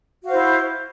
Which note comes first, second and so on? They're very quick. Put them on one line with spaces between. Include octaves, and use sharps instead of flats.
F#4 F5 C5 E4